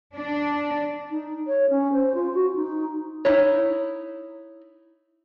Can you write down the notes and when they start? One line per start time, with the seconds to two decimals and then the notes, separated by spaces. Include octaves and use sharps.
0.15 D4
1.10 D#4
1.47 C#5
1.69 C#4
1.92 C5
2.14 F4
2.34 F#4
2.55 D#4
3.25 D#4 E4 C#5